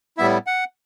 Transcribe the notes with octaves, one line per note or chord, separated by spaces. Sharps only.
A2 G3 B3 E4 E5
F#5